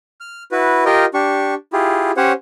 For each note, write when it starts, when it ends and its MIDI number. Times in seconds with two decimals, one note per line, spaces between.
0.20 0.43 89
0.52 0.84 64
0.52 0.84 66
0.52 0.84 71
0.85 1.05 65
0.85 1.05 67
0.85 1.05 70
0.85 1.05 75
0.85 1.05 79
1.14 1.54 62
1.14 1.54 67
1.14 1.54 85
1.73 2.11 64
1.73 2.11 65
1.73 2.11 67
1.73 2.11 68
2.17 2.32 61
2.17 2.32 67
2.17 2.32 72
2.17 2.32 73
2.17 2.32 78